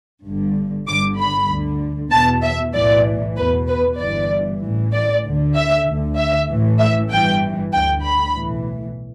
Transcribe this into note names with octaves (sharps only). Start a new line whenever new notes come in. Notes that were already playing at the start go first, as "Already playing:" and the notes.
G1 G2 D3
G1 G2 D3 D6
B5
D2 D3
E2 B2 A5
E5
B1 A2 E3 D5
E2 B2 B4
B4
G1 G2 E3 D5
A1 A2 E3
D5
D2 D3
E5
D2 D3
E5
A1 A2 E3
E5
G1 G2 E3 G5
D2 D3 G5
B5
B1 A2 E3